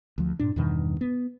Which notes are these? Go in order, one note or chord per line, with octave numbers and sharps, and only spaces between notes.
D2 F3
G2 A#2 D4
E2 G2 B2 D#3
B3